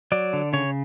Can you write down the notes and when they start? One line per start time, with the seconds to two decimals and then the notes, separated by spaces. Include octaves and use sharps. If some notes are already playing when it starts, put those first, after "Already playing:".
0.12 F#3 D5
0.33 D3
0.53 C#3 C#5